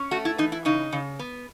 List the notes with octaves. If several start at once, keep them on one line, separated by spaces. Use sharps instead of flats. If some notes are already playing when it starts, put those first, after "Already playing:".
Already playing: C#4
A3 F#4
E4
E3 D#4
E4
C#3 D#4
C#3
B3